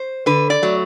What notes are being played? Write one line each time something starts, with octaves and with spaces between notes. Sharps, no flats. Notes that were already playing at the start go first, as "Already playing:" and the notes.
Already playing: C5
D3 B4
D5
F#3 A3